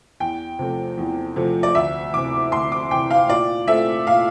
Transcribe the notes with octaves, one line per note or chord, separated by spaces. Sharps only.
E2 G5
C3 F3 A3 C4
E2
C3 F3 A3 C4
D5
D2 E5
C3 E3 D6
D2 C6
D6
C3 E3 G5
F5
A#2 D5
A3 C4 F4 E5
A#2 F5